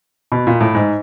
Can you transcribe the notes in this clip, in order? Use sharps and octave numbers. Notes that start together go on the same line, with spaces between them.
B2
A#2
A2
G#2